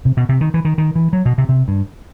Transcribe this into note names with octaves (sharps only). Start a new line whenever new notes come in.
C3
B2
C3
D#3
E3
D#3
D#3
E3
F#3
B2
C3
C3
G2